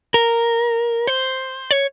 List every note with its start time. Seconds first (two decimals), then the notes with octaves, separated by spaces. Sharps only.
0.14 A#4
1.07 C5
1.71 C#5